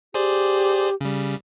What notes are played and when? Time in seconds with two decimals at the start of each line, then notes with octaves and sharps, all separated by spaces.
0.14 G4 G#4 C5 D5
1.01 C#3 G3